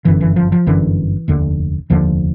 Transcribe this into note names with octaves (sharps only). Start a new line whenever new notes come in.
G1 F#2 D3 E3
E3
F3
F3
G1 F#2 D3 E3
F1 D#2 D3
F1 D#2 D3 F3